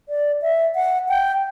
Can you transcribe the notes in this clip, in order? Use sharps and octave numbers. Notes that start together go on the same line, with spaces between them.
D5
E5
F#5
G5